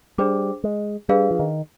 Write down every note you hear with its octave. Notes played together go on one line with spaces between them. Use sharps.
G3 D4 G#4 C5 G5 D6
G#3
G3 D4 G#4 B4 F5
F3
D#3